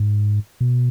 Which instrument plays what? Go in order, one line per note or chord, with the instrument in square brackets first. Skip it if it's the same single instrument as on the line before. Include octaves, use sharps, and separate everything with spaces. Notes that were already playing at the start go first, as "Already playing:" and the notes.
Already playing: [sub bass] G#2
B2